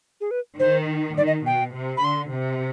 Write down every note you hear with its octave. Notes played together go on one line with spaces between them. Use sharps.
G#4
B4
D#3 C5
D#3 D5
D#5
B2 G5
C3
B5
D3 C6
C3